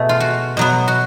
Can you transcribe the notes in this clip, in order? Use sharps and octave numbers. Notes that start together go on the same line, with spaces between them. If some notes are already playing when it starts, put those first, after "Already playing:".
Already playing: B2 A3 G#4
F4
F#4
B2 F#3 B3
F#4